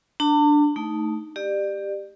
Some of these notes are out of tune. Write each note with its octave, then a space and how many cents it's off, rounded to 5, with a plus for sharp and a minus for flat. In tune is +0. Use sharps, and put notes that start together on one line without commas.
D4 +0 A5 +40
A3 +0 D#4 +0
G4 +10 D5 +30